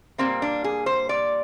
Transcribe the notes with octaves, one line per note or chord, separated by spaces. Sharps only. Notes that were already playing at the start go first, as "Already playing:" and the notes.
A#2 G3 A#3 C4
D4
G#4
C5
D5